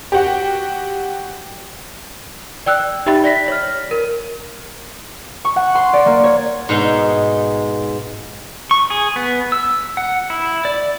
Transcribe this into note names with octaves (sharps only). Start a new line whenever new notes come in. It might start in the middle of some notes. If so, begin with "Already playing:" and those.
F#4 G4
D5 G5 E6 F#6
D#4 G4 E5 G5 B5 A6
D5 A#6 B6
C#5 F6
A#4
C#6
F#5
C6
D5
A#3
C#5
G#2 B2 G#3 D#4
C#6
G#4
B3
E6
F#5
E4
D5